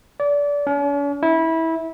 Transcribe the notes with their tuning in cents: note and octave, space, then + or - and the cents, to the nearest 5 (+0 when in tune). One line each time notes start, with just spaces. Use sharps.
D5 -25
C#4 +45
E4 -20